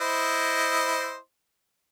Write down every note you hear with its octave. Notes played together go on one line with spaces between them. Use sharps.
E4 C5 D#5